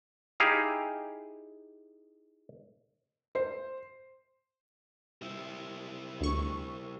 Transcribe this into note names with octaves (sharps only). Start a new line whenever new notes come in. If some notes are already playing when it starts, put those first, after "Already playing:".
D#4 E4 G4 G#4 F5
C5
G3 E4
D2 C#6